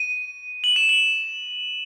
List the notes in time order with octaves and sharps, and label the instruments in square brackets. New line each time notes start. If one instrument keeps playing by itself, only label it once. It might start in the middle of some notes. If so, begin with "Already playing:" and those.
Already playing: [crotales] D#7
F#7
E7
F#7